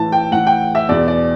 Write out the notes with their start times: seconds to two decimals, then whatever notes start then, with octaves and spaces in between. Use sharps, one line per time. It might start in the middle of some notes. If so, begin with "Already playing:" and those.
Already playing: A2 E3 A5
0.12 G5
0.31 A2 E3 F#5
0.47 G5
0.75 E5
0.89 E2 B2 D5
1.08 D5